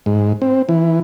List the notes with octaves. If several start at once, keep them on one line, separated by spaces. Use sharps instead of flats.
G#2
C4
E3